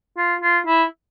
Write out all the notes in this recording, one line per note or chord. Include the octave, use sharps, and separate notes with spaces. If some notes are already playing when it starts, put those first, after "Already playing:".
F4
F4
E4